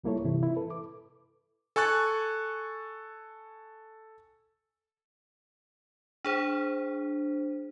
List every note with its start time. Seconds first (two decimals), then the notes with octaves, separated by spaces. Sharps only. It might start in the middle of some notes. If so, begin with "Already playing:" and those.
0.04 C#2 G3 A#3 E4 A4 C#5
0.24 G2 C3 E3 E4
0.43 E4
0.57 A4 B4
0.70 D6
1.76 A4 G#5 C#6 F#6 A6
6.25 D4 G#4 C5